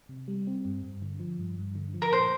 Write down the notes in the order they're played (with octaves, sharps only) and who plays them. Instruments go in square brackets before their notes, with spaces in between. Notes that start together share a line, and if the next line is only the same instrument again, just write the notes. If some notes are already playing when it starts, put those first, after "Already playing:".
[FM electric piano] C3
G3
C4
G2
G2
D3
F3
G2
G2
D3
F3
[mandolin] A#4
[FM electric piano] A#2 [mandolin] C5